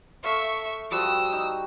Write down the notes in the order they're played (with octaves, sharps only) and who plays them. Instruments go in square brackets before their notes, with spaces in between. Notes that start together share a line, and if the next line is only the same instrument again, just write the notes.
[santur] A3 F5 [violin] E5 C#6
[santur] F3 G3 F#4 [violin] D#6 E6
[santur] D#4